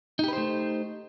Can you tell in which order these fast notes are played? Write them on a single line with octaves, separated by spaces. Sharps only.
D#4 G4 B4 C5 A3